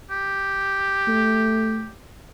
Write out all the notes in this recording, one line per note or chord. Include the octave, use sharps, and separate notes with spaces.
G4
A3